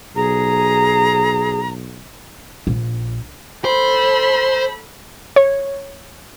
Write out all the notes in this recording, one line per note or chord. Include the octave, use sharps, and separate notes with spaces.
B1 G#4 A#5
A#1
A4 C5 B5
C#5